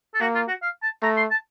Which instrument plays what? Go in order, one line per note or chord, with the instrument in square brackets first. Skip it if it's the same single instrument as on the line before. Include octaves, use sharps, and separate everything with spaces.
[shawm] A4
[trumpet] A#3 [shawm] F#4
[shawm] F4
F#4
F5
A5
[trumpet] A3 [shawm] A#5
[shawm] C6
A5